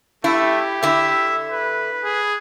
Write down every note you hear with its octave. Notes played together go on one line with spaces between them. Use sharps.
A3 E4 G4
D3 E4 E5
B4
G#4